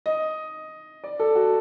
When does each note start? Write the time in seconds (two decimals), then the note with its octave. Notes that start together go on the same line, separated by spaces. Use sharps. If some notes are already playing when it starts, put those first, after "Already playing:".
0.06 D#5
1.04 D5
1.20 A4
1.35 F#4